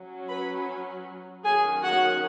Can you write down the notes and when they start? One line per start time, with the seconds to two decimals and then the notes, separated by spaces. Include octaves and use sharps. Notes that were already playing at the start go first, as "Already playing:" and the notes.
Already playing: F#3 C#4
0.29 B4 B5
1.45 D#3 F#3 C#4 G#4 G#5
1.83 F#4 F#5